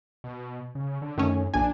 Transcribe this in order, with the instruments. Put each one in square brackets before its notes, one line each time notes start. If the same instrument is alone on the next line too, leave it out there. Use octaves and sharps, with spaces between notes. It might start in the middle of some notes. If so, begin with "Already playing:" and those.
[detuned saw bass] B2
C#3
D3
[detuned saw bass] F#2 [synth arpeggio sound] D#3 A3 C#4
[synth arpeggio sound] A#1 G#5 [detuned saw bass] D4